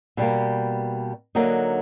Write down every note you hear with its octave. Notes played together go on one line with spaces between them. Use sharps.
B2 G3 A#3
D3 F#3 A#3 D#4